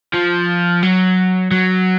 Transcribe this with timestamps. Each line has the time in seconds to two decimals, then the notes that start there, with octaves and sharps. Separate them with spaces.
0.14 F3
0.83 F#3
1.51 F#3